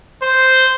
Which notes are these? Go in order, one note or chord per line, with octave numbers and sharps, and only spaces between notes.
C5